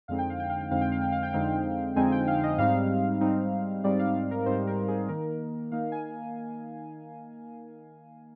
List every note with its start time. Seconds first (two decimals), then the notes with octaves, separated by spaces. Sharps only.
0.08 F2 D3 G#3 C4 D#4 F5
0.18 G5
0.30 F5
0.40 G5
0.50 F5
0.61 G5
0.71 F2 D3 G#3 C4 D#4 F5
0.81 G5
0.92 F5
1.01 G5
1.12 F5
1.23 G5
1.33 F2 D3 G#3 C4 D#4 F5
1.96 F2 D3 G#3 C4 D#4 G#5
2.12 G5
2.27 F5
2.43 D#5
2.58 G#2 G3 C4 D#4 F5
3.21 G#2 G3 C4 D#4
3.84 G#2 G3 C4 D#4 D5
3.99 F5
4.31 A#4
4.46 G#2 G3 C4 D#4 C5
4.67 A#4
4.88 G#4
5.09 D#3 A#3 D#4 A#4
5.71 D#3 A#3 D#4 F5
5.92 G#5